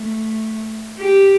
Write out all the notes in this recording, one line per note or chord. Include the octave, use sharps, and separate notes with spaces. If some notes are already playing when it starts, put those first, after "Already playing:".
Already playing: A3
G4